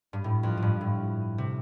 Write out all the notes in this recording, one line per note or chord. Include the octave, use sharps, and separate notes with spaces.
G2
A2
F2
A2
G2
A2
C3